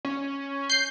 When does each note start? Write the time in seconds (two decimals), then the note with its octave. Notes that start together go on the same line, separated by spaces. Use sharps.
0.05 C#4
0.69 G6 C7